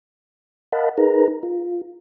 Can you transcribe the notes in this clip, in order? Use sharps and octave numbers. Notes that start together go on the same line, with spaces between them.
A#4 D#5 F5 F#5 A5 B5
D#4 G#4 A#4 B4 A#5
F4